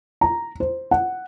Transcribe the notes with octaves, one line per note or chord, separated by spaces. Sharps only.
A#5
C5
F#5